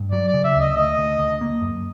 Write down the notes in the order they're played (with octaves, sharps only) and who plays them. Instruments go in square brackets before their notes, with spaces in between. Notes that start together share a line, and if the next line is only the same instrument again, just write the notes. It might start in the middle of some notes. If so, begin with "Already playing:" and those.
Already playing: [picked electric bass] G2
[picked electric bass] F#3 [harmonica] D5
[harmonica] D5
[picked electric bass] C#3
[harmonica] E5
[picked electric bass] D2 [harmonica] D#5
[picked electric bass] D2 [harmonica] D#5
[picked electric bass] D2
D2
A#3
F#2